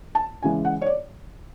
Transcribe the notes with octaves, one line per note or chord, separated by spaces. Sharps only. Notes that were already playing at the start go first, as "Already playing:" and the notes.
A5
C#3 E3 G#3 G#5
F#5
C#5
D5